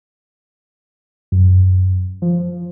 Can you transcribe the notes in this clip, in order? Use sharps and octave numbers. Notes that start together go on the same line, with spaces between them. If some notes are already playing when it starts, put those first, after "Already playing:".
F#2
F3